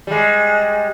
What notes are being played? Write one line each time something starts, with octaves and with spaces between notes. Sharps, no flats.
G3 G#3